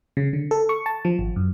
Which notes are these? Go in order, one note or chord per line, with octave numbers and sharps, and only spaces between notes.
C#3
D3
A4
C#6
A5
F3
G#1
F#2